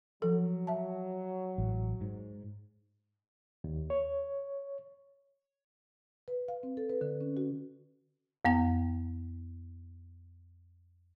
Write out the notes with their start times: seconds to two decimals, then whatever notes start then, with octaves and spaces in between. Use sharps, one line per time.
0.22 F3 F#3 A4
0.67 E5 A5
1.58 A1
2.01 G#2
3.64 D#2
3.90 C#5
6.28 B4
6.48 F5
6.63 C4
6.77 A4
6.89 B4
7.01 D3
7.21 C#4
7.37 F#4
8.45 F2 B3 G5